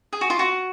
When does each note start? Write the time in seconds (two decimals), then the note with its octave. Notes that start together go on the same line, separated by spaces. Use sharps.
0.13 G#4
0.21 F#4
0.30 F4
0.39 F#4